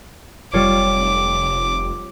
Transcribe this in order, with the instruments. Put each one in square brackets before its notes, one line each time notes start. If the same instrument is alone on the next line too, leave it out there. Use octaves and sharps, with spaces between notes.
[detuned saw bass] F1 [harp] G3 F4 C#5 [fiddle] D6